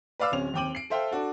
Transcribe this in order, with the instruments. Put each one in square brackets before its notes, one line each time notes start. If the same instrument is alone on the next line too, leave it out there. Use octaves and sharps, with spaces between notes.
[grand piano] B4 D5 F5 D6 E6
D1 C4 C#4 F7
D#2 C4 G5 D6 D#7 F#7
C7 D7
A4 C5 E5 F5 G5
D4 F#4 A4